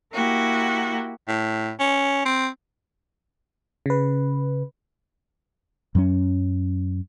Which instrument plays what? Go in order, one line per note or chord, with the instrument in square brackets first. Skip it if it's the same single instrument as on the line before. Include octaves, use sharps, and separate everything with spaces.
[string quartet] A#3 E4 F#4 G4
[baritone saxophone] A2
C#4
C4
[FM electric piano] C#3 B4
[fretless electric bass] F#2 F#3 G#3 C#4